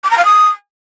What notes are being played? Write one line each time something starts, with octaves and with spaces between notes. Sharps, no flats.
D6
A#5
F5
D#6